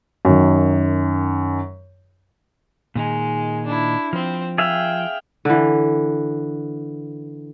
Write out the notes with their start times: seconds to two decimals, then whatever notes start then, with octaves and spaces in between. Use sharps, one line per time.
0.25 F#2 D#3
2.95 A#2 D#3 G#3 D#4
3.66 D4 E4
4.13 F3 C4
4.58 G#4 E5 F5 G5
5.45 D3 E3